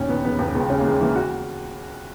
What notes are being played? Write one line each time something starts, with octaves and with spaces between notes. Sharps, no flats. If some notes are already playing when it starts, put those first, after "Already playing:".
Already playing: D#2 A#2 C#4
D#3 B3
E1 B3
D#2 B3
C#2 B3
C#3 C#4
A#3
E3 G#3
E3 A#3
F#4